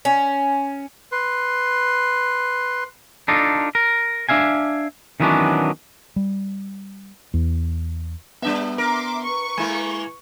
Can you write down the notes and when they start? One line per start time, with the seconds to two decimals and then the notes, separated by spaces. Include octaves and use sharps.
0.05 C#4
1.12 B4 C6
3.28 D4 D#4 F4 A4
3.75 A#4
4.29 D4 E5 F5 G#5
5.20 D#3 E3 F#3 B3 C#4 D4
6.16 G3
7.34 E2
8.42 G3 B3 D4 E5
8.78 A#4 E5 C6 D6
9.24 B4 C#6
9.58 G#3 A#3 E4 G#5